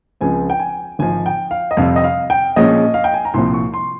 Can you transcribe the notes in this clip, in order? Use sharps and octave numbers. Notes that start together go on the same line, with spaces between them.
C#2 C#3 F3 C4 G#5
G5
G#5
G#1 G#2 F3 G#5
G5
F5
D#5
F2 C3 G3 C4 F5
D#5
F5
G5
A#1 A#2 F3 G#3 C#4 D#5
F5
G5
G#5
A#5
C2 A#2 F3 C4 C6
C#6
C6